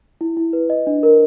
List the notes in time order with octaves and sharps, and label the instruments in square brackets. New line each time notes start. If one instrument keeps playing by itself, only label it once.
[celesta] E4
E4
B4
D#5
D4
A#4